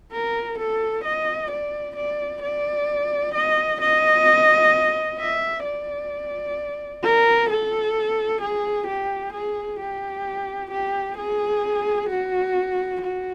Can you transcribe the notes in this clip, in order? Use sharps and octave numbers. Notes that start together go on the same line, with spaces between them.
A#4
A4
D#5
D5
D5
D5
D#5
D#5
E5
D5
A#4
A4
G#4
G4
G#4
G4
G4
G#4
F#4
F#4